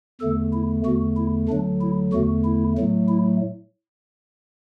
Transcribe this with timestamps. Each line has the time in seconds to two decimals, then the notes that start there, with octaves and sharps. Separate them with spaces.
0.21 E2 D3 A3 A4
0.53 E4
0.85 E2 D3 A3 F#4
1.17 E4
1.48 D2 D3 F#3 D4
1.81 E4
2.13 E2 D3 A3 F#4
2.45 E4
2.77 A2 F#3 A3
3.09 E4